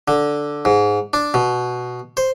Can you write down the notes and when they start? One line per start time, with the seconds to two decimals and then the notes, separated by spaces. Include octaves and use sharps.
0.08 D3
0.65 G#2
1.13 D4
1.34 B2
2.17 C5